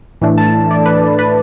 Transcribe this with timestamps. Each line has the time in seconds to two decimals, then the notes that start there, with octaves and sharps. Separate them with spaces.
0.22 A2 E3 A3 D4
0.38 A5
0.71 D5
0.86 B4
1.19 B4